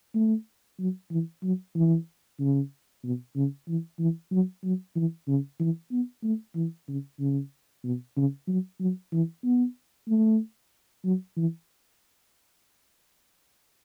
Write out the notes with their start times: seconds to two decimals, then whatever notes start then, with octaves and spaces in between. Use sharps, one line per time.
0.15 A3
0.79 F#3
1.11 E3
1.43 F#3
1.75 E3
2.40 C#3
3.04 B2
3.36 C#3
3.68 E3
3.99 E3
4.32 F#3
4.64 F#3
4.96 E3
5.27 C#3
5.60 E3
5.92 B3
6.24 A3
6.55 E3
6.88 C#3
7.19 C#3
7.84 B2
8.16 C#3
8.48 F#3
8.80 F#3
9.12 E3
9.44 B3
10.08 A3
11.04 F#3
11.37 E3